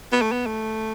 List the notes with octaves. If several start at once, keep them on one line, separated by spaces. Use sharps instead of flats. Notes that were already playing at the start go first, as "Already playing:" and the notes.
B3
A3
B3
A3